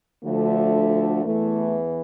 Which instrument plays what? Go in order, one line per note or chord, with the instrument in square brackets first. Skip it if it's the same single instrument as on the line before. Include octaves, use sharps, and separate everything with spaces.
[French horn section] D2 D3 F3 A3
E2 E3 A3